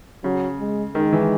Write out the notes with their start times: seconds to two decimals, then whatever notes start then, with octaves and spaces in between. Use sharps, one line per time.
0.24 C#3 F#3
0.60 G#3
0.95 D#3 G#3
1.13 E3